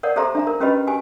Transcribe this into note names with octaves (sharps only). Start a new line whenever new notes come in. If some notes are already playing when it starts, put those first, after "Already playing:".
A#4 C#5 D5 F#5
G4 A4 C5 E5 A#5 C6
D4 E5 A#5
A#4
C#4 F#4 G4 B4 D#5 B5
F#4 G4 G#5